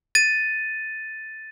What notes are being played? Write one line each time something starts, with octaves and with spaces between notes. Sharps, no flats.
A6 D#7